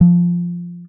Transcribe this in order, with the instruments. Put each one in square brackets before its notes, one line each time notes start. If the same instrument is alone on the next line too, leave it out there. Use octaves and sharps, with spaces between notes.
[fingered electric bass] F3